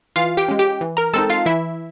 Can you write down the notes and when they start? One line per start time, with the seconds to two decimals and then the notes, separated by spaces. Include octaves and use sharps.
0.16 E3 F4 F5
0.37 G4 G5
0.49 G#3 C#4
0.59 G4 G5
0.81 E3
0.97 A#4 A#5
1.13 G#3 C4 D#4 A4 A5
1.30 F4 F5
1.46 E3 E4 E5